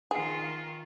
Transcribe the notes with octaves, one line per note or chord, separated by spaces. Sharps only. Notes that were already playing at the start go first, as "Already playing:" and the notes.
D#3 F4 G#4